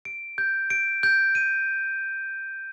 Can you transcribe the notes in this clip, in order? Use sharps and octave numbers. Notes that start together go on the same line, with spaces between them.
D7
G6
D7
G6
D#7